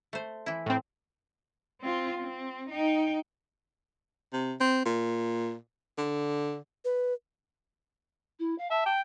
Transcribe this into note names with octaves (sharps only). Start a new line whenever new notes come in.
A3 C5
E3 E4
A2 C4
C4 F4
C4
D#4 G5
C3
C4
A#2
D3
B4
E4
F5
E5 A5
G5